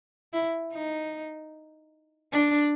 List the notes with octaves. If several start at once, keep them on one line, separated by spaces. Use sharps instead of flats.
E4
D#4
D4